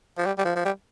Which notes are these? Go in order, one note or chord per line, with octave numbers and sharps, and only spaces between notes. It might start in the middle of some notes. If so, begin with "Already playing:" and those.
F3
G3
G3
F3
F3
G3